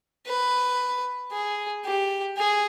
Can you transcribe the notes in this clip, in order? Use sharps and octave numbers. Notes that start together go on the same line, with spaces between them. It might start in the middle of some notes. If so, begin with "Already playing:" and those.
B4
G#4
G4
G#4